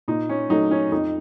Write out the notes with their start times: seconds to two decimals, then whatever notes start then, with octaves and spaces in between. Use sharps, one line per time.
0.08 A#2 D#4
0.29 C#4
0.50 F#3 A3 D#4
0.71 C#4
0.92 F2 D#4